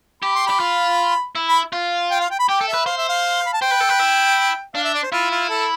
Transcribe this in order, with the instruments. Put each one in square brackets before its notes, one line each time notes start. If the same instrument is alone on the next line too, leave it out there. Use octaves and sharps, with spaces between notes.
[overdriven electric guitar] G4 [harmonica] B5
[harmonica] C6
[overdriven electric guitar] G4 [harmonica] B5
[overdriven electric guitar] F4
E4
[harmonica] B5
[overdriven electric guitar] F4
[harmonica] G5
F5
G5
B5
[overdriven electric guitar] G4 [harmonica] G5
[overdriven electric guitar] A4
[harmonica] E5
[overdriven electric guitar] B4
[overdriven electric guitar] C5 [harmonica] F5
[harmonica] E5
F5
B5
A5
[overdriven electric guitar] C5 [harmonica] G5
[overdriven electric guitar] B4
A4
B4
E4
[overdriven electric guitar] D4 [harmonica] F5
[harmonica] E5
D5
C5
[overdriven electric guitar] E4 [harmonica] F4
[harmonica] F4
A4